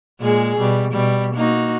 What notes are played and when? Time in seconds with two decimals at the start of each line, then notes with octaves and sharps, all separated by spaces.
0.20 A#2 G#3 G#4
0.58 B2 G3
0.92 B2 G3
1.35 A#3 D#4 F#4